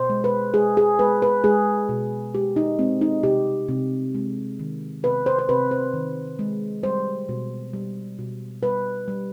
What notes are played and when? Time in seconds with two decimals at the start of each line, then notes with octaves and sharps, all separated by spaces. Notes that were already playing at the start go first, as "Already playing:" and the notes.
Already playing: B2 C5
0.10 G#3
0.24 B4
0.54 G#3 G#4
0.77 G#4
0.99 G#3 B4
1.22 B4
1.44 G#3 G#4
1.89 B2
2.34 G#3 G4
2.56 D#4
2.79 G#3 C4
3.01 D#4
3.23 C3 G4
3.68 C3
4.14 G#3
4.59 D#3
5.03 C3 B4
5.26 C5
5.39 C5
5.49 C3 B4
5.71 C5
5.93 D#3
6.39 G#3
6.83 G3 C5
7.29 B2
7.73 G3
8.19 B2
8.63 G3 B4
9.08 G3